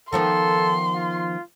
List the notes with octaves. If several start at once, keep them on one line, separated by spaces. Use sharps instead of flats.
D#3 F3 B3 A4 C6
F4